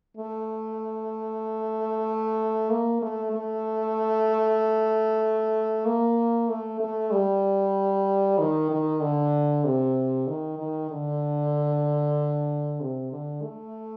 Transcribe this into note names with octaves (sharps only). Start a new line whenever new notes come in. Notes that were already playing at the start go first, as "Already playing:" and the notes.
A3
A#3
A3
A3
A#3
A3
A3
G3
D#3
D#3
D3
C3
D#3
D#3
D3
C3
D3
A3